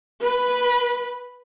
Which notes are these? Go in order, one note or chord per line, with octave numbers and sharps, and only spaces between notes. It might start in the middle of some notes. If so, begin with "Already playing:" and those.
B4 B5